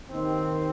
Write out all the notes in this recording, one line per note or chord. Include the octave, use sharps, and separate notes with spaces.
D#2 D#3 C4